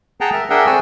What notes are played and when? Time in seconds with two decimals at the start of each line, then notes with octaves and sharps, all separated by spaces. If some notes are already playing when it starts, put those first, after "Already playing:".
0.21 G#4 F#5 G5 A5 A#5
0.33 A#4 E5
0.50 D4 G#4 A#4 E5 F#5 G5
0.66 C4 G#4 A4 G#5 C#6 E6